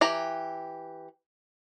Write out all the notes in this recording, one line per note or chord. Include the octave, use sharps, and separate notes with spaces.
E3 G4 A#5